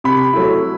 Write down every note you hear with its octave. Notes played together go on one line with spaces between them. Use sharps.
C3 B5
F#3 A3 E4